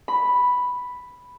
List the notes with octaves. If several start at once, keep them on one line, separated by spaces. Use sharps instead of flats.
B5